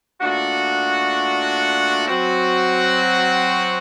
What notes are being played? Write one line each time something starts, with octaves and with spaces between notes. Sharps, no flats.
A#2 A3 D4 F#4
F#3 C4 F#4